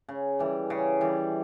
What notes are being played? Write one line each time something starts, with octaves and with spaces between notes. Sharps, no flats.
C#3
E3 G3
C#3
E3 G3